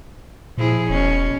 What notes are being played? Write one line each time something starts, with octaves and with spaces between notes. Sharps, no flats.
A#2 F3 E4 G#4
E1 B2 C#4